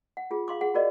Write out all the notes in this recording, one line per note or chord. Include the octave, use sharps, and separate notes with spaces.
F#5
F4 G#4
F5 C6 D6
G#4 F#5
F#4 G#4 A#4 D5 D#5